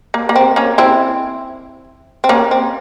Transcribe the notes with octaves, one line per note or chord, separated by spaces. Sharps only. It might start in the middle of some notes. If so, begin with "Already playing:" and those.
A#3
A#3
C4
A#3 C#4
C4 E4
C4
A#3 C#4
C4